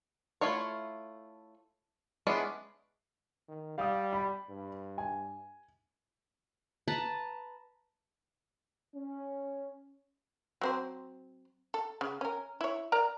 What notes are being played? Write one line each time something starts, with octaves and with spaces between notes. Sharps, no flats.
A3 E4 F4 C#5
G#3 B3 C#4 D4 E4
D#3
G3 F5 D#6
B5
G2
G#5
B4 A5 A#5
C#4
F#3 C4 C5
A4
C#3
C#4 A#4
E4 C#5
A#4 D5 A#5